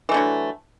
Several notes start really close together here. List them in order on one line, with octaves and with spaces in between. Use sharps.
E3 A3 D3 F#3